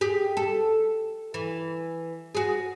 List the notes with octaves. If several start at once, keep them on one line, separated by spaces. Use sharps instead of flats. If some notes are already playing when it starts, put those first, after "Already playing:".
G4 G#4
A4
E3
F#4 G#4